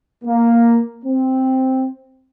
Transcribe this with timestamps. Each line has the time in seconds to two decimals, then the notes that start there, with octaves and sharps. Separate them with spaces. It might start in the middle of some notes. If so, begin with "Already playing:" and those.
0.25 A#3
1.04 C4